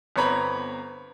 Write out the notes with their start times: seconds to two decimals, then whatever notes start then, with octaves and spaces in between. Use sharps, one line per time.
0.16 G1 B3 C4 C#5 A#5 B5